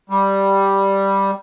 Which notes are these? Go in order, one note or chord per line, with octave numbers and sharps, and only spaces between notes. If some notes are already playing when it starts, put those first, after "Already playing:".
G3